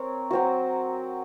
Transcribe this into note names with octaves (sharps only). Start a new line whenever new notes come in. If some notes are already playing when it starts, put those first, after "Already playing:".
Already playing: C4 A#4 C#5
F#3 C4 F#4